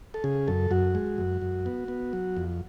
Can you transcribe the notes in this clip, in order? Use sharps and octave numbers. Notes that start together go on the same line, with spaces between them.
A4
C#3 G#4
F#2 A4
F#2 F#4
G#3
F#2
F#2
B3
B3
F#3
F2